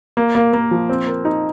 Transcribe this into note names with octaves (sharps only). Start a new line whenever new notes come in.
A#3
A#3
A#3
F3
C4
A#4
D#4